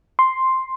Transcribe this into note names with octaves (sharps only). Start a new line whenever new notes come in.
C6